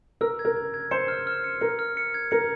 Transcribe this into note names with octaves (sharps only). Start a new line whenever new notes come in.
A#4 E6
G#6
A#4
G#6
G#6
C5 C#7
F6
F6
C#7
A#4 C#7
F6
C#7
G#6
A#4 C#7